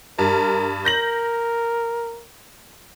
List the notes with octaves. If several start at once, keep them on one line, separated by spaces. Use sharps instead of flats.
G2 A#4
A#4 G6 A#6 F#7